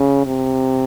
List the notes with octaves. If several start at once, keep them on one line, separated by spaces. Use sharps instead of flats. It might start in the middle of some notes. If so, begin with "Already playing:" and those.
Already playing: C#3
C3